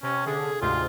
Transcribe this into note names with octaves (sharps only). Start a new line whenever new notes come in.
C3 C#4
D3 G#4
D2 G#2 C3 F4